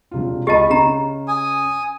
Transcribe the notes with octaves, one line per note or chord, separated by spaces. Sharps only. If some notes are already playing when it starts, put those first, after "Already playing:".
E1 C3 F4
C#2 G4 D#5 A5 B5 C#6
C#3 G4 A#5
G#5 D#6